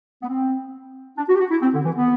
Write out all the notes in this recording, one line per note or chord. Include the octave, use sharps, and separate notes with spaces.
B3
C4
D4
F#4
G4
F#4
E4
C4
D3
E3
B3